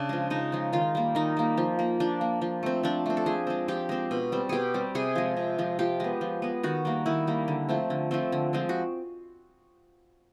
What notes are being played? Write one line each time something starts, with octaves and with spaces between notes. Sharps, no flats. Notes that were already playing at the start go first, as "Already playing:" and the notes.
Already playing: C#3 D4
F3 G#3
C#3 D#4
F3 G#3
D#3 F4
G3 A#3
D#3 D#4
G3 A#3
F3
A#3
F3 D4
A#3
F3
A3 C4
F3 D4
A3 C4
A4
F3 G#4
G#3 C4
F3 G4
G#3 C4
B2
G3 C4
B2 G4 G#4
G3 C4
C3 G#4
F3 G#3
C3
F3 G#3
F3 G4
G#3 B3
F3
G#3 B3
D#3 F#4
G3 A#3
D#3 E4
G3 A#3
D3
F3 A3 C4
D3
F3 A3 C4
D3
F3 G#3 C4
F#4